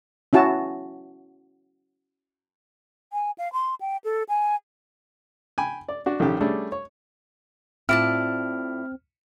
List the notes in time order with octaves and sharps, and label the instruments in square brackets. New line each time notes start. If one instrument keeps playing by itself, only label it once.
[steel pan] C#4 E4 F#4 A5
[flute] G#5
F5
C6
G5
A4
G#5
[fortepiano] G5 G#5 B5
D5
D4 F#4
A#1 D#3 C#4 G4 A4
G3 A3 C#4 D4 G#4
C#5
[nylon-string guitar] A2 F4 [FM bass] C4 [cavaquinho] E4 D5 A5 [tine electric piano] F6